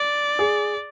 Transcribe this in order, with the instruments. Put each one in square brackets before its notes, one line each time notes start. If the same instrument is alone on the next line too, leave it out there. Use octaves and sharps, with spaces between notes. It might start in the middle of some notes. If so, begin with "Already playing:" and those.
Already playing: [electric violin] D5
[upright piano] G#4